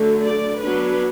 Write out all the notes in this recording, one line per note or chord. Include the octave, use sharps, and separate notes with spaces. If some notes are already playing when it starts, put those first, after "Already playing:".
Already playing: D3 F#3 A3
D5
F#3 B3 D4 B4